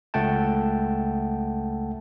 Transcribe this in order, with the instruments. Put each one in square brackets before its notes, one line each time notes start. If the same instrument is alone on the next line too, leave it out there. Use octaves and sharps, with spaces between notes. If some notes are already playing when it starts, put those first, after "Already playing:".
[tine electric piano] C#2 A3 F#5 G5 A5